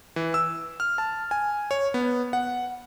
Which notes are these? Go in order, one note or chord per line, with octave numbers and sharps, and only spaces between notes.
E3
E6
F6
A5
G#5
C#5
B3
F#5